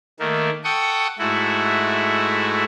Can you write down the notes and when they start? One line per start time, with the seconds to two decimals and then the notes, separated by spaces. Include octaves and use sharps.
0.20 D#3 A3 A#3
0.64 A4 F#5 G5 C#6 D#6
1.19 G#2 A3 E4 F#4